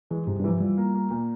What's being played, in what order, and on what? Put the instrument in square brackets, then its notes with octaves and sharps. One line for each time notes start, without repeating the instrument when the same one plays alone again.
[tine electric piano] E3 [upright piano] G#3
[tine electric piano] G2 [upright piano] C3
[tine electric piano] G2
[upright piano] E3 [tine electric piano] F3
[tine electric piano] G3 [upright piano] F4
[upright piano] A#3
A#3
A#2